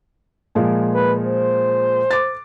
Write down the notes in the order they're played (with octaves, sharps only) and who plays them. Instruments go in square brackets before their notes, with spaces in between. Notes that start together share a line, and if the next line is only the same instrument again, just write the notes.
[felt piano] A#2 F3 G#3
[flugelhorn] B4
C5
[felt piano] D6 A6